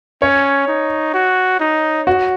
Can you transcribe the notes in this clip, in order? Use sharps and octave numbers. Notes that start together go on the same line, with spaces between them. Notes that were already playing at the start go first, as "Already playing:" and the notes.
C#4 C#5
D#4
F#4
D#4
F#4